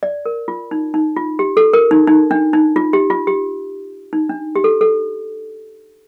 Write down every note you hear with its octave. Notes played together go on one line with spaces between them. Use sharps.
D5
A#4
F4
D#4
D#4
F4
G4
A4
A#4
D#4
D#4
D4
D#4
F4
G4
F4
G4
D#4
D4
G4
A4
A4